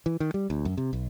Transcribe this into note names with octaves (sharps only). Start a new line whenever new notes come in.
E3
D#3
G3
D2
F#2
C3
B1